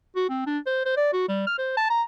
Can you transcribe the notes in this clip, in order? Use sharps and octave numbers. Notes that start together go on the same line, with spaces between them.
F#4
C4
D4
C5
C5
D5
F#4
G3
F6
C5
A5
A#5